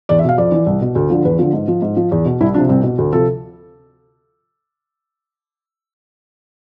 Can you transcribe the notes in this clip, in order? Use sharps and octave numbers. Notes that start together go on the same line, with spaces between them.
E2 D5
E5
B2 F5
F2 D5
E3
C2
B2
D2
D3 F3
E2 B4
D3 F3
G#2
F3
G#2
F3
E2
B2
C2 E4
C3 F3 D4
C2 C4
B2
D2
C3 F3 A4